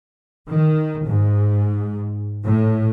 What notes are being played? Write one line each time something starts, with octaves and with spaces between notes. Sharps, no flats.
D#3
G#2
A2